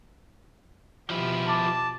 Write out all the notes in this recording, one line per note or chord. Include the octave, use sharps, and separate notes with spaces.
B2 F3 E4 F4 G4
A5 D6